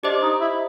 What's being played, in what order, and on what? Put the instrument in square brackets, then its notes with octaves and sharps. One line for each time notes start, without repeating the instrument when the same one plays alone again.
[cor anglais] D4 [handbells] G4 C5 D#5
[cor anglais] D#4
E4